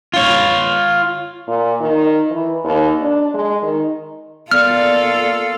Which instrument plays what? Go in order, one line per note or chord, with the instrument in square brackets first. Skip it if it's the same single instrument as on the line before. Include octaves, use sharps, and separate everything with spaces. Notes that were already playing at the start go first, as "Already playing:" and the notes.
[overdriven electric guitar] F4 C#5
[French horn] A#2
D#3
E3
D#2
D4
G#3
D#3
[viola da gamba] A#3 F4 A4 [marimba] B3 [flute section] D5 [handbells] F6